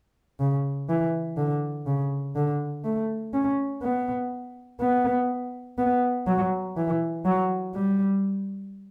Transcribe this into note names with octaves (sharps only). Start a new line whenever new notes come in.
C#3
E3
D3
C#3
D3
A3
C#4
B3
B3
B3
F#3
E3
F#3
G3